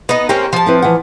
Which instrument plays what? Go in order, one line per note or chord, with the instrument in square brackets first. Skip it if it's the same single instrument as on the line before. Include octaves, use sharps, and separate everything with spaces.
[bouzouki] B3 D#4 [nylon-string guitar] D#5
[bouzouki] A#3 C4 C#4 [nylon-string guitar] G4
[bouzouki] F3 A5
[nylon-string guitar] C4 E4 B4
E3 F#5